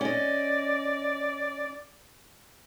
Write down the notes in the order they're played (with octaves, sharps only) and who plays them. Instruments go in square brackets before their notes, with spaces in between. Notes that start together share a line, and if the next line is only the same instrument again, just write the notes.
[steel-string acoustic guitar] C#4 D#5 [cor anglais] D5